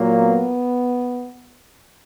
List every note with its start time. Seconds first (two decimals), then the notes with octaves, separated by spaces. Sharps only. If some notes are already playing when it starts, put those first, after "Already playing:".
Already playing: A#2 F#3 A#3
0.20 B3